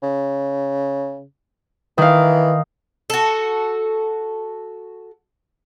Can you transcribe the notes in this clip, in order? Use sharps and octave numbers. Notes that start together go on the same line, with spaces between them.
C#3
D#3 E3 F5
F#4 A4